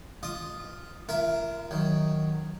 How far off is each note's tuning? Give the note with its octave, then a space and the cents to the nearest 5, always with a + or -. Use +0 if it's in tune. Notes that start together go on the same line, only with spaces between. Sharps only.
F4 +0 D#5 +0 D#6 -45
F4 -45 A#4 +0 E5 +0
D#3 +0 F#3 +0